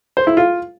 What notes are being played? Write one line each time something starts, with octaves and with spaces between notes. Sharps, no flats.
C5
E4
F4